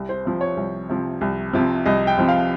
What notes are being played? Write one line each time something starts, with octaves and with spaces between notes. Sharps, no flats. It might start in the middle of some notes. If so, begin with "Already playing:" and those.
Already playing: C2
C5
C3 F3
C#5
C2
C3 F3
C2
C3 F3
C2 D#5
G5
C3 F3
F5